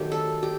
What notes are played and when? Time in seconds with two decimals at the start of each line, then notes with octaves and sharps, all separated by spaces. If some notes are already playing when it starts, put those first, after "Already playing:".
Already playing: D#3 F#3 A3 G4
0.12 A4
0.43 G4